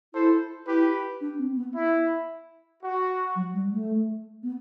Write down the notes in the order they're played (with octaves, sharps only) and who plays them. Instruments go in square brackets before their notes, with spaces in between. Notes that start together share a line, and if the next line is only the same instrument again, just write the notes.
[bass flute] E4 [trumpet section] A4 C5
[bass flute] E4 [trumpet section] G4 B4
[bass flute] D4
C4
B3
[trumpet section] E4
F#4
[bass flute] F#3
G3
A3
B3